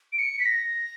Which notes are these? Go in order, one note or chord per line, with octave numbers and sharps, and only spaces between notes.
D7
C#7
B6
A#6